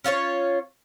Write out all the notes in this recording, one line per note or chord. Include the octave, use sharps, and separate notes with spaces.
C#4 F4 A4 C#5